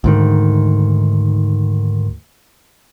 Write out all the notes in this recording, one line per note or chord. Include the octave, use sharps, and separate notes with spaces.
D2 G#2 D#3